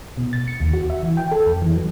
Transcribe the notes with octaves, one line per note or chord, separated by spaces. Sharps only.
B2
A6
C#7
D#2
F#4
E5
E3
G5
A4
F2
E3
F#3